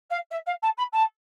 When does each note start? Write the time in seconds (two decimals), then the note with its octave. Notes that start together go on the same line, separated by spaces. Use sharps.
0.10 F5
0.31 E5
0.46 F5
0.62 A5
0.77 B5
0.92 A5